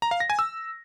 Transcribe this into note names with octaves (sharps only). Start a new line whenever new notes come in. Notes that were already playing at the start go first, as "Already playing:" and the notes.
A#5
F5
A#6
G#5
E6